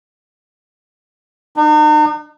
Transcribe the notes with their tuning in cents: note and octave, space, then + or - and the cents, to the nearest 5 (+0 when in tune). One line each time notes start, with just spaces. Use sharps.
D#4 -45